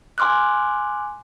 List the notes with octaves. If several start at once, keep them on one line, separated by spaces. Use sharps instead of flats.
G#5 C6 D6 F6 F#6